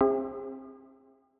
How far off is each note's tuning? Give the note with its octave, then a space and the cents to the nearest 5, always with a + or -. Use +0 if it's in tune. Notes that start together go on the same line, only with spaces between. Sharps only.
C4 +30 G#4 -35 E5 +0